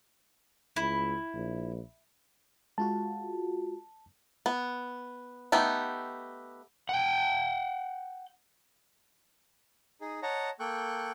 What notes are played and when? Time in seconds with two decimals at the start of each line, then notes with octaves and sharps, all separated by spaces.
0.76 C#2 E4
1.34 A#1
2.78 G#3 F4 F#4 A5
4.46 B3
5.52 A3 B3 D#4 G4
6.89 F#5 G5
10.01 D#4 G#4
10.23 C#5 D#5 F#5 A5 A#5
10.60 A#3 A4 G5 C#6 F#6 G6